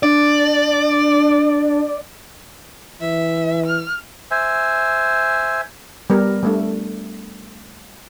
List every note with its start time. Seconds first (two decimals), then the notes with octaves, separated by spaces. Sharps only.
0.03 D4 D5
3.01 E3 E5
3.66 F6
4.31 C5 E5 G#5
6.10 G3 B3 A#4
6.43 G3 A3 D4